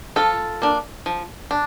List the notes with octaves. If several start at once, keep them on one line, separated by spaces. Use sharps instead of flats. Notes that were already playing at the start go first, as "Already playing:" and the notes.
F3 F4 A4
A#3 D4
F3
D4